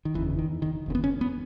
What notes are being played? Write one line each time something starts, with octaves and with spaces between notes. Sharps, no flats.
D#3
F#1 E2 C#3 E3
D#3
D#3
F#1 E2 C#3
B3
C#4
B3